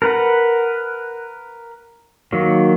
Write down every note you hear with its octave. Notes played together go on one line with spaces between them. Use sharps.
A#4 B4 F#5
D#3 F#3 A#3